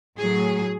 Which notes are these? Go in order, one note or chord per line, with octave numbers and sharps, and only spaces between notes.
A2 F#3 A3 G#4